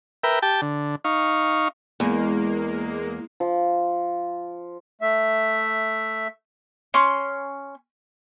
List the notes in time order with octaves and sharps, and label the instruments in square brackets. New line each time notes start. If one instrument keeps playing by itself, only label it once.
[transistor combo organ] A#4 B4 E5 G5
G4 G5 A5
D3
D#4 F5 C#6
[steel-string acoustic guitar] E2 [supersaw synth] G#3 A#3
[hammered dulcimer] F3
[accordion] A3 E5
[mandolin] C#4 C6